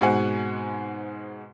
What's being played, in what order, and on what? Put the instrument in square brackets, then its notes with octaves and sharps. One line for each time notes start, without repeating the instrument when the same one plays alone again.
[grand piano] G#2 B2 G#3 C4 F#5 G#5